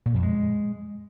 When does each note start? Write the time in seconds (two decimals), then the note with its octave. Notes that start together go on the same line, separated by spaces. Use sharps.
0.06 A#2
0.14 F2
0.23 G#3